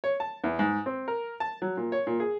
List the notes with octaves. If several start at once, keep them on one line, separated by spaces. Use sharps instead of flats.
C#5
A5
E2
G#2
C4
A#4
A5
F#3
A#2
C#5
A#2
G#4